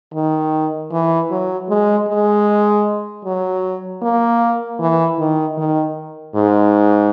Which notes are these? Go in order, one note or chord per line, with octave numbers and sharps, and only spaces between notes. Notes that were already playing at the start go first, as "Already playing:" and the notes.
D#3
E3
F#3
G#3
G#3
F#3
A#3
E3
D#3
D#3
G#2